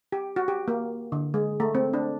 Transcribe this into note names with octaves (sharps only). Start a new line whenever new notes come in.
G4
F#4
G4
A#3
D3
G#3
A3
C4
D4